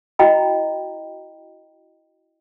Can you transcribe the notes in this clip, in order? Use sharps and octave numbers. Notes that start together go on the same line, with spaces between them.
E4 F#4 D#5 G5 A#5 B5